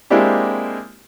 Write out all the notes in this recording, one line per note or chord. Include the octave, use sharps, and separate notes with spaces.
G#3 A#3 C4 D4 E4 G4